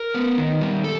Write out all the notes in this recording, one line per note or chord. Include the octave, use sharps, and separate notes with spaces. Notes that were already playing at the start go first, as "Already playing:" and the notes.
Already playing: A#4
B3
D#3
G3
A4